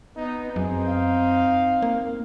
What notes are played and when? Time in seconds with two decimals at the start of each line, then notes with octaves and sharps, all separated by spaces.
0.16 B3 D#4
0.56 F#2 C4 D#4 G#4
0.88 F5
1.82 A#3